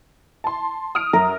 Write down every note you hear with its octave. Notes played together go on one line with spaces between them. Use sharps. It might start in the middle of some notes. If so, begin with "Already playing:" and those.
A5 C6
D#6 F6 D7
F#2 A#4